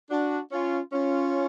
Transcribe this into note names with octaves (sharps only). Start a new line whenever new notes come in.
D4 F#4
C#4 F4
C#4 F4